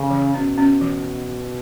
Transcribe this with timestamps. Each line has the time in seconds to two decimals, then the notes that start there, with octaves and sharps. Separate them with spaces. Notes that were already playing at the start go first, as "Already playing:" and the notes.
Already playing: C#3
0.10 E3
0.34 B2 C#4
0.58 C#4
0.81 E3